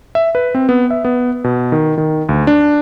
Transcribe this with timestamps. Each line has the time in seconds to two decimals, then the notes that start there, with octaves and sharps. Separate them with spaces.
0.15 E5
0.35 B4
0.55 C4
0.69 B3
0.91 E5
1.05 B3
1.44 B2
1.72 D#3
1.98 D#3
2.29 D2
2.47 D4